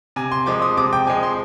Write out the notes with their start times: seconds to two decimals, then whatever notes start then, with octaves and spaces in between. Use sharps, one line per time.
0.16 C3 G#5
0.32 C6
0.46 F3 G#3 D6
0.62 D#6
0.77 C3 D6
0.93 G5
1.07 F3 G#3 G#5
1.23 C6